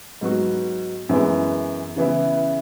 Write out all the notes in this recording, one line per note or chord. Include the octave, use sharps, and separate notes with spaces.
G#2 F#3 B3 F#4
F#2 E3 G#3 B3
C#3 E3 B3 E4